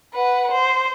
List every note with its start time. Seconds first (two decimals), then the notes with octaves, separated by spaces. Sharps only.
0.14 B4 F#5
0.51 C5